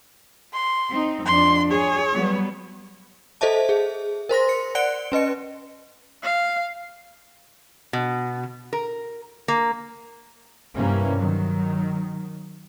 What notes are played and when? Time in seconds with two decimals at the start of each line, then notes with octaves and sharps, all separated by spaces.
0.53 C6
0.90 C4 D#4
1.25 F2 D4 C6
1.71 G#4 C#5
2.13 F#3 G3 B3
3.41 A4 C5 D#5 E5 A5
3.69 G#4
4.29 A#4 C5 C6 A#6
4.49 C#7
4.75 D5 F#5 F#6 C#7 D7 G7
5.12 C#4 B4 D#5 C#7
6.23 F5
7.93 B2
8.73 A#4
9.48 A#3
10.76 G2 C3 E3 A#3 C#4
11.17 D#3 F#3